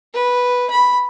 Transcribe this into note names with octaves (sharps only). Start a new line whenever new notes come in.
B4
B5